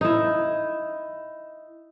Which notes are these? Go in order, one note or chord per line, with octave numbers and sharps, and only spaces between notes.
D#4 E4